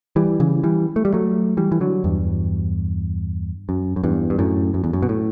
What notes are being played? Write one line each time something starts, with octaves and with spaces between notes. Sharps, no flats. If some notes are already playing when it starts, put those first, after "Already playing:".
E3 G3
C#3 E3
E3 G3
A3
G3
F#3 A3
E3 G3
E3
D3 F#3
E2 G2
F#2
F#2
E2 G2
G2
F#2 A2
F#2
E2
F#2
B2
A2